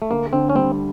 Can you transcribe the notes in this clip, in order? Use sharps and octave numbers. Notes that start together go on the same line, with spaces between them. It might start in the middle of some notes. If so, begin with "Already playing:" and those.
A3
D2 A#3
D3 C4
C#4
G3 C4